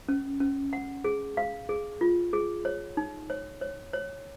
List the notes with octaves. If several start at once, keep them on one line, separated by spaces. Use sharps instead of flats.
C#4
C#4
F#5
G#4
F5
G#4
F4
G#4
C#5
D#4
C#5
C#5
C#5